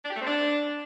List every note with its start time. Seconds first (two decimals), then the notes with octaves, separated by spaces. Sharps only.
0.05 D4
0.10 G4
0.16 A3
0.21 C4
0.27 D4